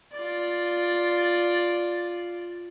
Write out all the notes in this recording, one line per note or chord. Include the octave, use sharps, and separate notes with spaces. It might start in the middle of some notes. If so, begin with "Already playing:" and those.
F4 D5